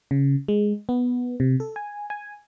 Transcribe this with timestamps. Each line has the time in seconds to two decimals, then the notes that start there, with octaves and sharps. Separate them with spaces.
0.11 C#3
0.48 G#3
0.89 B3
1.40 C3
1.60 A4
1.76 G#5
2.10 G#5